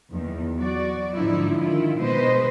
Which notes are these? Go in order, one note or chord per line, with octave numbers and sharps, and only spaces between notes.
E2 D#3
F#3 F#4 D5
G#2 D3 F3 D#4 E4
D#3 E4 F4
B2 G#3 B4 C5 D#5